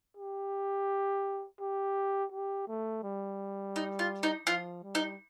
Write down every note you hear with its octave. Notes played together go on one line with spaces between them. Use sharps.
G4
G4
G4
A3
G3
D#4
F4
D#4
F3 F4
G3
D#4